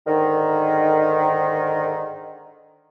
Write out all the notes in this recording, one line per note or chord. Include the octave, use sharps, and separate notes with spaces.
G#2 D3 D#3